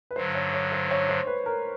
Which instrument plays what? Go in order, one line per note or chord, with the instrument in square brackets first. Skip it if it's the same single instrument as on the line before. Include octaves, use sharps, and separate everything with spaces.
[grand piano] B4
[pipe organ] G2 D3 F#3 [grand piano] C5
[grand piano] C#5
C#5
C5
C#5
C5
B4
A#4